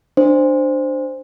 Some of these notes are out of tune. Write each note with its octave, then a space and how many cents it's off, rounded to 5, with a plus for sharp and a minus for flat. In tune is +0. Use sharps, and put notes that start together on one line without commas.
D4 +15 C5 +0